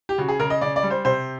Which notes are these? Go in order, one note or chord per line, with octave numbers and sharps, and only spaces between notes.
G4
C#3 F#4
G#4
C#3 A#4
D#5
C#3 D5
D5
G3
C5
C3 C5